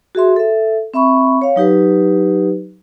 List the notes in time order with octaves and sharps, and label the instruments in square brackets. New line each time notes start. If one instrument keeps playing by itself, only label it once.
[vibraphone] F#4 G#4 E5 C6
A4 E5
C4 E5 B5 C#6
C#5 F5
F#3 D#4 G4 B4